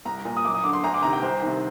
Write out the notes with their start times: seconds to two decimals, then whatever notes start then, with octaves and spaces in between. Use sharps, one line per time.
0.05 C2 A#5
0.25 A#2
0.37 D#6
0.45 F#2 D6
0.54 D#6
0.64 D3 D6
0.73 C6
0.83 D2 A#5
0.94 D6
1.03 C3 D#3 A#5
1.13 G5
1.22 C2 C5
1.42 C3 D#3